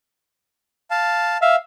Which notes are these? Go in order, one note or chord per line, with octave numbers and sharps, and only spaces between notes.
F5 A5
E5 F5